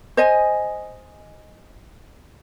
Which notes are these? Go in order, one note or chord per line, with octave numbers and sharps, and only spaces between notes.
C5 D#5 G#5